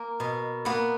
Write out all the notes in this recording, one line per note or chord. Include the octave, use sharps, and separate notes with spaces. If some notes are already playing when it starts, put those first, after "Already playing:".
Already playing: A#3 A#4
B2
A#3 B3 B4